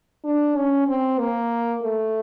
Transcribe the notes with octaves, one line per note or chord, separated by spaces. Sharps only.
D4
C#4
C4
A#3
A3